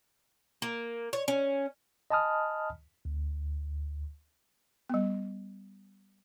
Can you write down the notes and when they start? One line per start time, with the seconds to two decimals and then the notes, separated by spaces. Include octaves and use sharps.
0.62 A#3
1.13 C#5
1.28 C#4
2.11 D#5 G#5 A5 B5 D#6 F6
3.05 D2
4.90 G3 B3